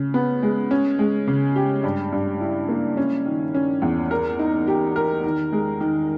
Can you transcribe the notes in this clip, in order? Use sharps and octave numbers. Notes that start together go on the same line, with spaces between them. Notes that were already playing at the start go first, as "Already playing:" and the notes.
Already playing: C#3
B3
G#3
C#4
G#3
C#3
G4
G2
G2
E4
A#3
C#4
D#3
C#4
E2
A#4
D#4
G4
A#4
D#3
G#3
D#3